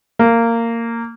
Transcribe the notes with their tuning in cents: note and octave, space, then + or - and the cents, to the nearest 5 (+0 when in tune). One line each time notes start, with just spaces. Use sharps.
A#3 -15